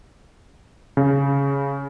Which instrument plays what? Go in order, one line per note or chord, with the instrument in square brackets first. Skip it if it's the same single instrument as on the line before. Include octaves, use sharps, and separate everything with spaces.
[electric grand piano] C#3